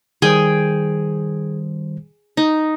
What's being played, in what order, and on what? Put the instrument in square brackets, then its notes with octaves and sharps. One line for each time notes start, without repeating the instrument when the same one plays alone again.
[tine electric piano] D#3 G3 C5 [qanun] G#4 G5 G#5
[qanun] D#4